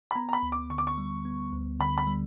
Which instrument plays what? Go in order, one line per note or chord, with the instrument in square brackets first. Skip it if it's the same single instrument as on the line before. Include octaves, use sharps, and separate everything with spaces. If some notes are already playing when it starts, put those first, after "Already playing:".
[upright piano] B5
[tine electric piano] B3 [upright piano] A#5
[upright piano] A#5
B5
[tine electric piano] D2
[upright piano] D6
[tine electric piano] D3 [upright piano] C#6
[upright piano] D6
C#6
[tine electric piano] G3
B3
D2
[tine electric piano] D3 [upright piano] B5
[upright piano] B5
[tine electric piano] G3